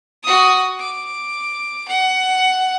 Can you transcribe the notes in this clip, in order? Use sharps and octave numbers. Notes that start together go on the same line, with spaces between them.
F#4 D#6
D6
F#5